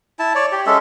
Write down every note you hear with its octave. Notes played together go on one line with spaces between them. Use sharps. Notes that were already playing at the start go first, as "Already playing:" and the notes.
E4 A5
C#5 D5
G4
G#3 C#4 A4 E5